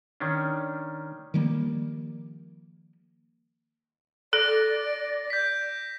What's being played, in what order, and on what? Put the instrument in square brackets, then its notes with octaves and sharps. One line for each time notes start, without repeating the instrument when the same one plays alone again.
[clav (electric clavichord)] D#3 C#4 D4
[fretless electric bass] D#3 F3 G3 A#3
[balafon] A4 [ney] D5 [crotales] A#6 D7
[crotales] G6 B6